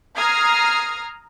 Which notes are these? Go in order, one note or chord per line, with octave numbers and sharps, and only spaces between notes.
A#5 D#6 F6 G#6 C7